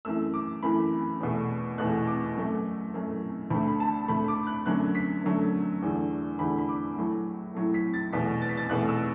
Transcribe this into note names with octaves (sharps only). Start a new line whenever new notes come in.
F#2 E3 A3 E6
D6
F#2 E3 A3 B5
E2 B2 A3
E2 B2 A3 F#6
D6
F#2 F#3 A3
F#2 F#3 A3
D2 D3 A3 B5
B5
A5
D2 D3 A3 B5
D6
F#6
F#2 D3 F#3 A3 F#6
B6
F#2 D3 F#3 A3
E2 D3 A3
E2 D3 A3 B5
B5
D6
A2 F#3 A3
A2 F#3 A3
B6
A6
E2 B2 A3 B6
A6
B6
A6
E2 B2 A3 F#6
E6